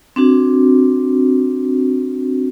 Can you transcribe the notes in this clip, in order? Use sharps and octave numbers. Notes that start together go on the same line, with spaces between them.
C4 D4 F#4